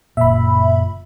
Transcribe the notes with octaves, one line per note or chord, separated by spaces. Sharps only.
F#1 A#2 E5 B5